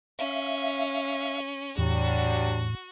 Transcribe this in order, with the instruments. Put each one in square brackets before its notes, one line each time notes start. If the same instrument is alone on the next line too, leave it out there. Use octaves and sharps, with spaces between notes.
[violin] C#4 [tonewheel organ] E5 F5
[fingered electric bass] E2 [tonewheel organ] A2 [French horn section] F#3 G3 D4 [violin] F#4